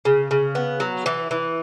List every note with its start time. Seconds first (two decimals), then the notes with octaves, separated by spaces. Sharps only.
0.05 C#3
0.31 C#3
0.55 B3
0.80 F#3
1.06 E3
1.31 E3